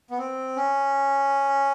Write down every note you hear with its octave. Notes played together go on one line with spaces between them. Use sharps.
B3
C4
C#4